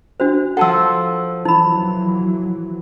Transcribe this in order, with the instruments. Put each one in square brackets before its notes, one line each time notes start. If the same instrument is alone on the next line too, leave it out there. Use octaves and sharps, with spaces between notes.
[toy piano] D4 F#4 C5
[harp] F3 A4 [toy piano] F#5 A5 E6
[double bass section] E3 F#3 [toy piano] D#4 B5